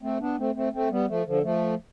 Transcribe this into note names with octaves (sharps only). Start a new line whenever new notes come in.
A3 C4
B3 D4
A3 C4
A3 C4
A3 C4
G3 B3
F3 A3
D3 F3
F3 A3